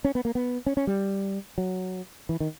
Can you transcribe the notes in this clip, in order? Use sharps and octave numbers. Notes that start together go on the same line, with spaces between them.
C#4
B3
A#3
B3
C#4
C#4
G3
F#3
E3
D#3